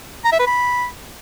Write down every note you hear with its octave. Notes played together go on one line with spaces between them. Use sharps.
A#5
E5
B4
B5